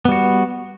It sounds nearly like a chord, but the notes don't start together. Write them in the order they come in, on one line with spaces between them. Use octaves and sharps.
B3 G3 F#4